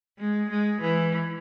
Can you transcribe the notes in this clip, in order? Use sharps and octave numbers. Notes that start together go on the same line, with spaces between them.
G#3
G#3
E3